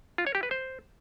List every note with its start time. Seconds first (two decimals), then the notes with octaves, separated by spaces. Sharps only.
0.18 F4
0.27 C#5
0.35 G4
0.43 B4
0.51 C5